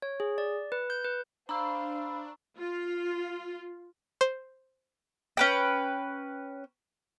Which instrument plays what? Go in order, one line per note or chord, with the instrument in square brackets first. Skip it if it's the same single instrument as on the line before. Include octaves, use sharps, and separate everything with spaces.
[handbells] C#5
G#4
D5
B4
G6
B4
[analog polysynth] D4 [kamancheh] C5 F5 [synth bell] A#5 C#6 E6 [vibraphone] B5
[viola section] F4
[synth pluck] C5
[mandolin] C#4 B4 G5